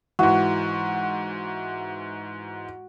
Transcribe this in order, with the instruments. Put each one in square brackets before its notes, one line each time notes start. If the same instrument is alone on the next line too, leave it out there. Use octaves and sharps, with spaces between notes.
[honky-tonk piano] G#2 E3 [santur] F#4